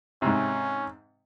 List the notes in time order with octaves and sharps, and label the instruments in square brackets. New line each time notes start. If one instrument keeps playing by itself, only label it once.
[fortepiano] G#2 C3 [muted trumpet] C#4